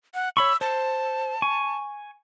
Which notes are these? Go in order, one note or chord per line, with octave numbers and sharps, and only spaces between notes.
F#5
C#5 B5 C#6 E6
C5 A5
G#5 C#6